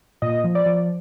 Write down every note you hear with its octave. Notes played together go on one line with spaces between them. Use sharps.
A#2 D#5
F3
D5
F3